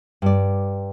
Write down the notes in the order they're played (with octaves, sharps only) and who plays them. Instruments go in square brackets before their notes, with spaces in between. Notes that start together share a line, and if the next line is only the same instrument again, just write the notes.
[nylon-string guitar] G2 D5